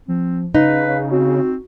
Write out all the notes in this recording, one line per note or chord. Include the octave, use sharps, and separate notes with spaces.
F3 C4
C#3 D#4 B4 F5
C4 F#4